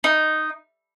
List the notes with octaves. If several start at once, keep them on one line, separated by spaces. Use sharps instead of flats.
D#4